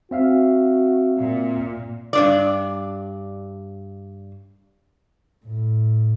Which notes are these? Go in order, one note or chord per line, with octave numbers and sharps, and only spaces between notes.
C4 F#4 E5 F5
A#2
G2 D4 D5
A2